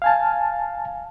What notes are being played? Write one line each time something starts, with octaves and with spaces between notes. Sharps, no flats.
F5 G#5 A5